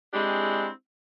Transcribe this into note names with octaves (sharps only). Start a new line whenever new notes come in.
G#3 C4 D4 E4 G4 G#4